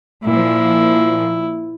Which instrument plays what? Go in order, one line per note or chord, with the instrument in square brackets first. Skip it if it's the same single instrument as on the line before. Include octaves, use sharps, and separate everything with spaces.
[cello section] A#2 F3 [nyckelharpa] E4